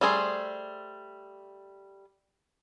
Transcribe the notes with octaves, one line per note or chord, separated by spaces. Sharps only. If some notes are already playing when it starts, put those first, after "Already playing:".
G3 A3 G#4 A4 C5